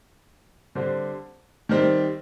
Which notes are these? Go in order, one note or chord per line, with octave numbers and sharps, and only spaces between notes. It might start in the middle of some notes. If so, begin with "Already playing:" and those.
D3 G3 C4
D#3 G3 C4